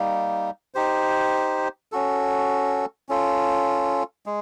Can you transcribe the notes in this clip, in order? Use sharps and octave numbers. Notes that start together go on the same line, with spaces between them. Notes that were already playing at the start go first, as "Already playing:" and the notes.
Already playing: G3 A#3 D#4
D#4 G4 C5
C#4 F#4 A4
C#4 F4 A4
G#3